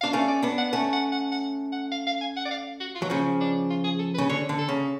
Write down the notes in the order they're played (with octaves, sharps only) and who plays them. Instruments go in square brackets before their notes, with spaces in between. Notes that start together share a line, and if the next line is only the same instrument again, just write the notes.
[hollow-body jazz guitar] D4 [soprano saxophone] F5
[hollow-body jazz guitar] A3 C#4 [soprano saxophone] D5
[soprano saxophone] D5
[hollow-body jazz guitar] B3 D4
[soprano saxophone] F#5
[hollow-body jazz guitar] A3 C#4 [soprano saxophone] F#5
[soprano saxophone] F#5
F#5
F#5
F#5
F5
F5
G#5
F#5
D5
F5
F#4
F4
[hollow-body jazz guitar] F#3
[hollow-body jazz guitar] C#3 F3 [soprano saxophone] C#4
[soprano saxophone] D4
F4
G#4
A4
B4
[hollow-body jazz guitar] C#3
[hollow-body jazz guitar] D3 [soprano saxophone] C#5
[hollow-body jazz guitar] D3
[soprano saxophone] A4
[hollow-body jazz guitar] C#3